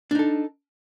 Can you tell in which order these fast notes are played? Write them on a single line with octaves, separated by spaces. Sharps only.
D4 D#4 A4